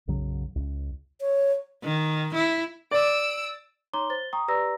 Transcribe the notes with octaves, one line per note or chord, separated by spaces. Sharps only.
B1 F#2 C#3 F#3
C#2
C#5
D#3
E4
D5 E6 D7
D#4 C#5 A#5 C6 D6 G7
C5 A6 G7
G5 A#5 C#6 D#6
G4 B4 D5 A#5 E6 A#6